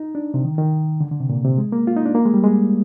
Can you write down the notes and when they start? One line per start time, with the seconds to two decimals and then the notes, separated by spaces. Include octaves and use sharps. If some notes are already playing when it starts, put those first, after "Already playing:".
Already playing: D#4
0.15 D4
0.34 C3
0.45 D#3
0.58 D#3
1.00 D3
1.11 D3
1.20 C3
1.29 A#2
1.45 C3
1.58 G#3
1.72 A#3
1.87 F4
1.97 D#4
2.05 D4
2.15 A#3
2.25 G#3
2.34 G3
2.44 G#3